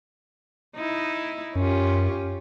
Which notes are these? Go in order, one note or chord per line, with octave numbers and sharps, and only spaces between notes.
D#4 E4
F#2 C#4 F4 G4